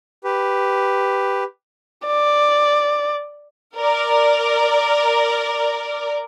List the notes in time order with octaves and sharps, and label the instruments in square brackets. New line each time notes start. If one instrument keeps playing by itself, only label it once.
[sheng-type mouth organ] G4 B4
[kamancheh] D5
[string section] A#4 D5